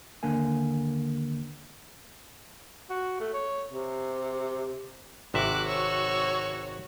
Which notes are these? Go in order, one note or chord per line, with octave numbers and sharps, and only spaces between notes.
D#2 D3 A#3 A#4 G#5
F#4
A3
C#5
C3
G#1 C3 F#4 E5 D6 F#6
C#5 C#6 E6